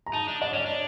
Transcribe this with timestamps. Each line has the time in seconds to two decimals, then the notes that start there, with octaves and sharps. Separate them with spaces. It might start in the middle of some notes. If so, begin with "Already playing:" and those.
0.06 A#5
0.13 D#4 A5
0.28 D4
0.41 D4 D#5
0.51 C#4 C#5 D5
0.66 D4